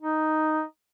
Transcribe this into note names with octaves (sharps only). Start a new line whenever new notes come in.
D#4